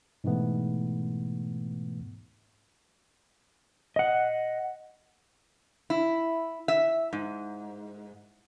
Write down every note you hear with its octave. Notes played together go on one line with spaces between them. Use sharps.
G#2 B2 E3 A3 B3
D#5 F#5
E4
E5
G#2